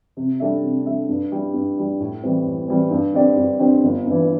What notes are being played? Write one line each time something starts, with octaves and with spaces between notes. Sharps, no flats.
C3
G3 D4 A4 E5
C3
G3 D4 A4 E5
G2
G3 E4
G2
G3 E4
A2
E3 G3 C4
A2
E3 G3 C4
G2
D3 C4 G4 D5
G2
D3 C4 G4 D5
G1
G2 E3